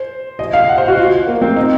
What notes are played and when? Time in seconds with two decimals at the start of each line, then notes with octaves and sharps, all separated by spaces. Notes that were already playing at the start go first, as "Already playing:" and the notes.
Already playing: C5
0.39 D#5
0.53 F5
0.69 F#5
0.78 C5
0.88 F#4
0.98 F4
1.27 A#3
1.42 C4
1.56 D#4